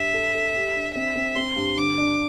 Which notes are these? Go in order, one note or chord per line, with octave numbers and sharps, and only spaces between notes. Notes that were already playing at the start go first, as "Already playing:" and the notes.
Already playing: G2 E5
A4
A4
G4
D4
C4 E5
C4
C4 C6
G2
D3 D6
D4